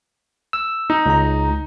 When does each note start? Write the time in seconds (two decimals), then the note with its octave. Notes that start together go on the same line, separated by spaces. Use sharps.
0.53 E6
0.90 D#4
1.06 C#2 A#5